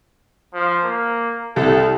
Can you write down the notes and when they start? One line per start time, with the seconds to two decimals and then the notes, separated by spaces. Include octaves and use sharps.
0.54 F3
0.84 A#3
1.56 C2 A4